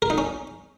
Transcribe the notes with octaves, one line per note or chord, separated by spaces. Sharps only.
A#4
D#4
C#4